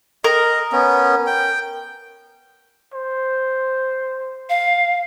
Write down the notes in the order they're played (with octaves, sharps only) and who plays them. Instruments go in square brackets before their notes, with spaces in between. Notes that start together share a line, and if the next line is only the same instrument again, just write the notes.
[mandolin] A#4 [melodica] D#5
[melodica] B3 C#4
G5
[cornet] C5
[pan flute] F5